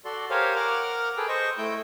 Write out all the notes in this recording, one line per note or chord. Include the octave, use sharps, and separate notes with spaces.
F#4 A4 D5 C6
G4 A#4 C5 C#5 F5 G#5
A#4 F#5 D6 F6
G#4 A4 B4 G5
C5 D#5 C#6
A3 E4 G5 G6